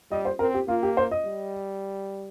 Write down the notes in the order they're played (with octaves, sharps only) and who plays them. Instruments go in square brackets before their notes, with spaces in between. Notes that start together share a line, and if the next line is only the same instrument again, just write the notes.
[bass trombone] G3 [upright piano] D#5
[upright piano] C5
[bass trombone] C4 [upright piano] A#4
[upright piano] G4
[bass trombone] A#3 [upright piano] F4
[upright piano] G4
C5
D#5
[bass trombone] G3